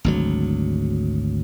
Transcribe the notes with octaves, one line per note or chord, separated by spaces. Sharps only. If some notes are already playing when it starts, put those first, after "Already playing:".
G#1 D2 F#3